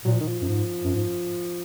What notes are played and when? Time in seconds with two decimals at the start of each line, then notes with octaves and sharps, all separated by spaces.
0.05 A#2 F#3
0.13 F3
0.20 D#3
0.28 F3
0.42 F#2
0.49 G#2
0.84 F#2
0.94 G#2